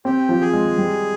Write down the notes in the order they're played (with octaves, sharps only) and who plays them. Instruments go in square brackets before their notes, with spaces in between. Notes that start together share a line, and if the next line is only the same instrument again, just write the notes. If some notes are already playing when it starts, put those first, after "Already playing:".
[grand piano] C4 [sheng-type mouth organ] G4
[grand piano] F3
[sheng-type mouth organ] G#4
[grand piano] G#3
G3